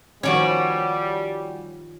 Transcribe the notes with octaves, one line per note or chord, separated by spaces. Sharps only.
D#3 F3 G3 B3 C#4 F#4 C#5 D5